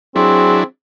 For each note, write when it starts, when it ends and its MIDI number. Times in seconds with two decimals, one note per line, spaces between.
0.16 0.64 54
0.16 0.64 60
0.16 0.64 62
0.16 0.64 64
0.16 0.62 68